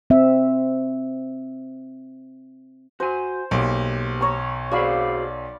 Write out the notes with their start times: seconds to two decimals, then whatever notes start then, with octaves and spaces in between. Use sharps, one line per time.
0.10 C4 E5
3.00 F#4 C5 G#5
3.51 B1 A#3 G4
4.21 C#5 A#5 C#6
4.72 F#4 G#4 C5 D5 F5 B5